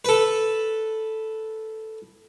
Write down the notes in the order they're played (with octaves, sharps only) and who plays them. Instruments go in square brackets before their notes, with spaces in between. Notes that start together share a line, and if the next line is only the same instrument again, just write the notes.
[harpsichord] A4 B4